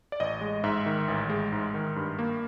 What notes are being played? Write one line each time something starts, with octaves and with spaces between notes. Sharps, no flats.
D5
A1 D#5
G#3
G#2 E5
D#3
A1
G#3
G#2
D#3
G2
A#3